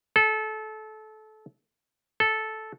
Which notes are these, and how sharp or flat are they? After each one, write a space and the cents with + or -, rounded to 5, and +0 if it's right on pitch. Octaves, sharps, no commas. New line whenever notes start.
A4 -25
A4 -10